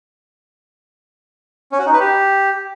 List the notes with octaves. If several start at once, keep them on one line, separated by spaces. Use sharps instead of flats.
C#4
F#4
D#4
B4
G4